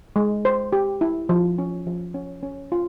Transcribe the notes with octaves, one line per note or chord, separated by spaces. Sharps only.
G#3
C5
G4
E4
F3
C#4
F3
C#4
C#4
F4